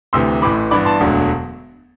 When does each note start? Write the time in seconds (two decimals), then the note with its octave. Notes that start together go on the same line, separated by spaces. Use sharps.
0.13 D2 C3 E3 C6 E6
0.42 A1 A2 E3 B5 D6
0.71 G2 E3 B3 D4 B5 D6
0.85 A5 C6
1.00 E1 D2 D3 F#3